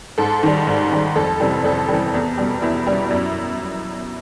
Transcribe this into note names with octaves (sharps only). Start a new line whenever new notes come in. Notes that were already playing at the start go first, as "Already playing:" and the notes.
G#2 A4
D#3 G3
G#2
D#3 G3
F2 A4
C3 E3 G3
F2 A4
C3 E3 G3
E2
B2 G3
E2 E4
B2 G3
F#2